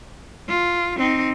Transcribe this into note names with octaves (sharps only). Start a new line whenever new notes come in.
F4
C4 D#4